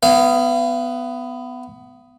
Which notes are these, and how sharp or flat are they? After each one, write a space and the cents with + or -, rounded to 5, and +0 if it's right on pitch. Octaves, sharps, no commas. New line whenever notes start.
B3 +15 F5 -40